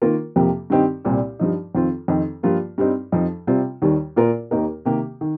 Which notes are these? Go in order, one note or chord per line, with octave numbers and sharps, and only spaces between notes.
D#3 A#3 F4 A#4
F2 C3 F3 A#3 G4
G2 D#3 C4 D#4 G4
C2 A#2 G3 C4
G2 F3 D#4
F2 D#3 C4 F4
F2 D#3 C4 D#4
G2 F3 A#3 F4
G2 G3 C4 D#4
F2 F3 D#4
C3 G3 C4 F4
D#2 D#3 G3
A#2 A#3 F4 A#4
D#2 D#3 A#3 D#4 A#4
C3 D#3 A#3 G4
D#3